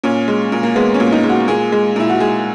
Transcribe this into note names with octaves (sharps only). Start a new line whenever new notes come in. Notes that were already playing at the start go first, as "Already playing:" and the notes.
A#2 C#4
G#3
A#2
A#3
G#3 B3
C#4
A#2
D#4
G#3
F#4
A#2 G#4
G#3
A#2 E4
F#4
G#3 G#4